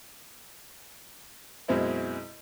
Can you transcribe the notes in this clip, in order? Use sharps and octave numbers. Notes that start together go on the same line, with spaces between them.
F#2 B2 G#3 C4 E4